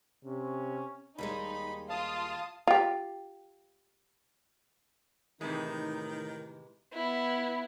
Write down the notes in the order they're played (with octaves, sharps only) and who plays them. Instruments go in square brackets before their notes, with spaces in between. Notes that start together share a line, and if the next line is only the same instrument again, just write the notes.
[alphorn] C3 [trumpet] C#4
[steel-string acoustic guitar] D#2 G3 G#3 [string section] D#4 [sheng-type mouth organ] B5
[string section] F4 [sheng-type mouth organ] F5 [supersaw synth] A5 D#6
[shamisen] F4 G4
[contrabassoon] A2 [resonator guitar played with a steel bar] C3 E3 G#3 [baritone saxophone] D#3 [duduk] D#4
[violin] B3 E4